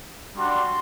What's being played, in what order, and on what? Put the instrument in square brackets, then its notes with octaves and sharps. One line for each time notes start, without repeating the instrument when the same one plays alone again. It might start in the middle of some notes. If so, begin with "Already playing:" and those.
[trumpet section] G3 D4 F#4 C6